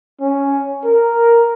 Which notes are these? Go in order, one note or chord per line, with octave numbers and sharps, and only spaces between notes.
C#4
A#4